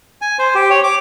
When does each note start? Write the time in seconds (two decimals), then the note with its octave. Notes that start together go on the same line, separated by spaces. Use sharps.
0.22 G#5
0.39 C5
0.55 G4
0.70 C#5
0.84 D6